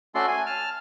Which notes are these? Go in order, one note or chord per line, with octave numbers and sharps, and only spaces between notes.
A3 C#4 F#4 A4 D5 C6
G#5
A5 F6